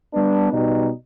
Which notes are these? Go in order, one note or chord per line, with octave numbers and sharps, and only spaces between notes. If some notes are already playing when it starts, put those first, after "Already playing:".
G3 B3 D4
B2 G3 D#4